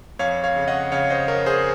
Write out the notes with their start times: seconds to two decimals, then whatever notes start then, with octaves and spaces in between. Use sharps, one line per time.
0.19 F2 C#5 F5
0.44 C#5 F5
0.56 C#3
0.68 D#5 F#5
0.92 C#3 C#5 F5
1.10 C5 D#5
1.28 F2 A#4 C#5
1.46 G#4 C5